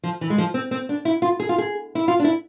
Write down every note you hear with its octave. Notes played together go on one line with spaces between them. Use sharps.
F3
E3
G#3
F3
C4
C4
D4
E4
F4
G#4
F4
G#4
E4
F4
D4
E4